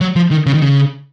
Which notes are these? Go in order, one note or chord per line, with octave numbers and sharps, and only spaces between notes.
F#3
F3
D#3
C#3
D#3
C#3